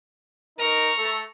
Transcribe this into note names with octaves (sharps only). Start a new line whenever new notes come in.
D#4 A#4 A#5 C#6
A3 A4